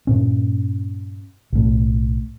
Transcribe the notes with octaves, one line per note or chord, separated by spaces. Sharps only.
G2 A#2 C#4
B1 A2